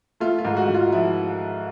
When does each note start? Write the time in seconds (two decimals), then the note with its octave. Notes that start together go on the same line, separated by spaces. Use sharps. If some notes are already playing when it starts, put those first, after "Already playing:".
0.20 A3 F4
0.39 F4
0.45 G#2
0.57 F#4
0.68 G#2
0.74 F4
0.92 F3 E4